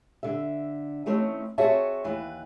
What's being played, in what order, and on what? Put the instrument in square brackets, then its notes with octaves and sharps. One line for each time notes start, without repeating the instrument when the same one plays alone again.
[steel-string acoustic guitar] D3 E5
E3 A3 C4 C#4 D#4
C4 F#4 G#4 C#5 E5 A5
D#2 E3 B4